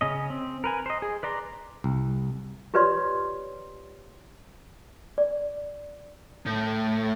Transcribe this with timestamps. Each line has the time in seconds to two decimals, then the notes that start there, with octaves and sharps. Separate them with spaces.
0.01 C#3 C#4 D#5
0.30 C4
0.64 A#4 B4 G#5
0.86 C5 D#5
1.02 G#4
1.23 B4 D5 A#5 C6
1.84 C2
2.74 F4 G4 B4 C#5 D5 C6
5.18 D5
6.46 A2